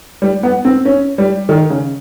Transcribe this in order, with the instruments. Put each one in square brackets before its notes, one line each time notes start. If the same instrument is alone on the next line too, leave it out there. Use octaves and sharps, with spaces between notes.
[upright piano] G3
B3
C4
C#4
G3
D#3
C#3